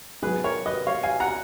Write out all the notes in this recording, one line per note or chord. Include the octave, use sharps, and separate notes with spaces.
G#2 F#3 B3 G#4 B4
A#4 C#5
B4 D#5
C#5 F5
F5 G#5
F#5 A#5